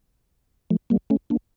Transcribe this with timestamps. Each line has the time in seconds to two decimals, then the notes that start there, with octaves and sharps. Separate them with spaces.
0.70 F3 A3
0.90 G3 A#3
1.10 A3 C#4
1.30 A#3 D4